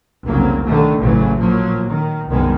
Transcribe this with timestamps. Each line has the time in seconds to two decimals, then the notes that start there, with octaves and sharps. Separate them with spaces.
0.24 F1 C2 C#3 F#3 A#3 C4
0.64 D3 D#3 A3
0.98 A1 D2 C#3 E3 F#3 A3
1.36 A#2 F3 F#3 A#3
1.86 D#3
2.27 C2 F#2 D#3 G#3 B3